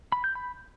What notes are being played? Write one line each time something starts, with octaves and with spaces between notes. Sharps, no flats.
B5
G6
B5